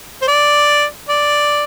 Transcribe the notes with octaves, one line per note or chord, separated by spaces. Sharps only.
C5
D5
D5